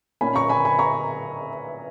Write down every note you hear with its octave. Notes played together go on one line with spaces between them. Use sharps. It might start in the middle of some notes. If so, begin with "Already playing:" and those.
A#2 A#3 C#4 G#5 B5
A#5 C#6
G#5 B5
G#5 B5
A#5 C#6